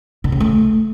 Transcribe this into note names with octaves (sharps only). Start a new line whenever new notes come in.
D3
C#3
A3